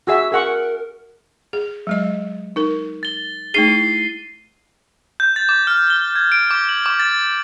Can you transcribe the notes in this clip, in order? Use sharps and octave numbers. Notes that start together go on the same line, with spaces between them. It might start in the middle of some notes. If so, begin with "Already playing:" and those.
F#4 G#4 E5 E6
G#4 A#4 F#5 C#6
G#4
F#3 G#3 D#5
D#4 A#4
A6 G7
A3 D#4 G#4 C7 D#7 G7
E4
G6
A6
D6
F6
G7
G#6
D7
D6
F#7
D6
A6